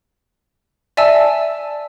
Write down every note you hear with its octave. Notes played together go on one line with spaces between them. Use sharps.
D5 E5 G#5 A5 E6